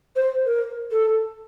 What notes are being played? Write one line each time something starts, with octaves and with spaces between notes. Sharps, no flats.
C5
A#4
A4